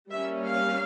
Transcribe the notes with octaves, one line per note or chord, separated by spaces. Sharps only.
G3 A#3 C#4 E5
F5